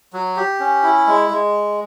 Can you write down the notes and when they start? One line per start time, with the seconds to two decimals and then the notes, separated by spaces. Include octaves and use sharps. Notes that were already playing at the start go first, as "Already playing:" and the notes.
0.13 F#3
0.37 G4
0.60 C#4
0.83 E4
1.07 G#3
1.30 G#3